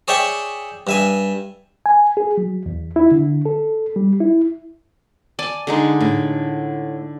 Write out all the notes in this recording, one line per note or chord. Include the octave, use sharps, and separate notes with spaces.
G#4 C#5 D5 E5 G5 C#6
G2 E5 G#5
G#5
G#4
F#3
E2
E4
D3
A4
G3
E4
D5 G#5 A5
D3 G#3 D#4
A2